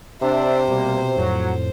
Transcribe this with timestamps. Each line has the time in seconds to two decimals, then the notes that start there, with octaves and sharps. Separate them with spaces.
0.22 C3 D4 C5 E5
0.68 B2 G3 A#3
1.17 F2 A2 F#3